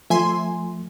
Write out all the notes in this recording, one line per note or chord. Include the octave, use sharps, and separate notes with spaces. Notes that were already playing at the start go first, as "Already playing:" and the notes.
F3 A3 E5 G#5 C6